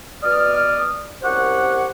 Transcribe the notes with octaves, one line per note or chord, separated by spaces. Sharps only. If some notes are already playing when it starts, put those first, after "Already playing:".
B2 D5 D#6 F6
C2 F#2 G4 C5 C#5 F#5